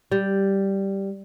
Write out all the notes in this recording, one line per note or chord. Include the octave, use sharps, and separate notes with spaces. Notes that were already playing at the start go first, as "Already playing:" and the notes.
G3